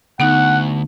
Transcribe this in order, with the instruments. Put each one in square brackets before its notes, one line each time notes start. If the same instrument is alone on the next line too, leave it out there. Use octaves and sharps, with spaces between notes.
[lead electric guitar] D2 [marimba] B3 D#4 [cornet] F#5